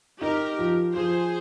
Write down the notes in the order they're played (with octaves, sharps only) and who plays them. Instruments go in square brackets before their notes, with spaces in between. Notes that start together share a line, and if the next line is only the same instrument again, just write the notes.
[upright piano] D#4 [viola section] G4 A#4
[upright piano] F3
[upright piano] F3 [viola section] G#4 C5